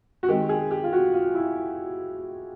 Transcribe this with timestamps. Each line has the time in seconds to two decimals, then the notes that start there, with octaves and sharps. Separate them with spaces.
0.23 F#4
0.28 D#3 G#3 C4 G4
0.49 G#4
0.71 G4
0.84 F4
0.93 F#4
1.14 F4
1.35 E4